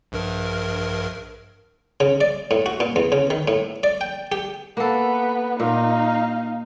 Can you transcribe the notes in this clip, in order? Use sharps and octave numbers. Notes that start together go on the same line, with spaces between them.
A#1 G2 A#4
C#3
D5
A2
F#4
A#2
E2
C#3
D#3
A2
D5
G5
G4
A#3 B3 A4
A#2 D#4 F5